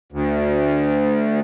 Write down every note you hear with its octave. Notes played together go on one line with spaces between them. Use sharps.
D2